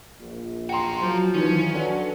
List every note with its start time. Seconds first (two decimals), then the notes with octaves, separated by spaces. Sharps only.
0.20 A#1
0.69 F#4 A#4 G5 C6
1.02 F3 F#3
1.34 A#1 D#3 E3 C#4 D#4
1.74 F#3 D4 A4 B4 F#5